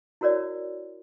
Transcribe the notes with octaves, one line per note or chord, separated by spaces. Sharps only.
E4 F#4 A#4 C#5 D5